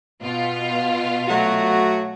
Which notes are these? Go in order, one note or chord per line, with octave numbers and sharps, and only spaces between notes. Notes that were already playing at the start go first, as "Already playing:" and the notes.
B2 F4
F#3 A3 F#4